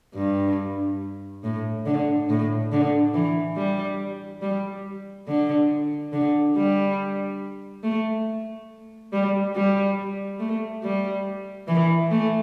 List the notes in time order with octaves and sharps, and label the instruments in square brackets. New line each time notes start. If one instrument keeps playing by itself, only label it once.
[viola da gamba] G2
A2
D3
A2
D3
E3
G3
G3
D3
D3
G3
A3
G3
G3
A3
G3
E3
A3